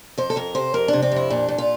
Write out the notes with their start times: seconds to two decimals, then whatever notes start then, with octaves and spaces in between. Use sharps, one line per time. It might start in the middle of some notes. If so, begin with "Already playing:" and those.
0.18 F2 C5
0.30 A4
0.36 F2 A#4
0.55 C3 C5
0.74 F2 A#4
0.88 C3 D4
1.02 C4
1.12 F2 E4
1.30 A#2 D4
1.48 A#2
1.58 F4